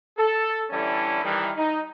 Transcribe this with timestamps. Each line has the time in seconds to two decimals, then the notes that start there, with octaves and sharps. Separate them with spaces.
0.18 A4
0.71 D3 E3 G3 C#4 E4 A4
1.23 D#3 E3 G3
1.56 D#4